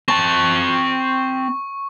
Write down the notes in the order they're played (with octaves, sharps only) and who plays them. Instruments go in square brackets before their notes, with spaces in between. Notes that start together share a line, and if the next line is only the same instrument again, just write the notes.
[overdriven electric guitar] C4 A5 [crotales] C#6